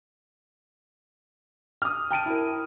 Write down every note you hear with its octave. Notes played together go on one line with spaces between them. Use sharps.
D#6 F6
G5 A5 D7 D#7
E4 A#4